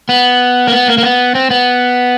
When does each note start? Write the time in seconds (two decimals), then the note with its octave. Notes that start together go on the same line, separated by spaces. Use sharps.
0.09 B3
0.67 A#3
0.72 B3
0.88 A#3
0.98 A#3
1.03 B3
1.35 C4
1.50 B3